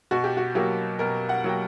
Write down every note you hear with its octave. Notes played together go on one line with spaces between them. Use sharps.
B2 F#4
G4
F#4
F#3 A#3 G4
B2 A#4
F#5
F#3 A#3 G5